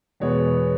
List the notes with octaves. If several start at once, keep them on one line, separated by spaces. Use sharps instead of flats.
E2 B2 G#3 B3 C#5